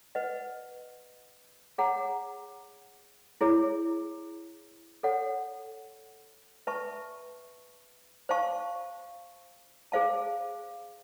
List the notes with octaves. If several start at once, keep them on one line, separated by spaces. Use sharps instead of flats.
B4 D#5 F#5
G#4 C#5 F#5 A#5
E4 G#4 C#5
A4 C#5 F#5
B4 E5 A5 C#6
C5 F5 A5 C#6
G#4 C5 F5 A5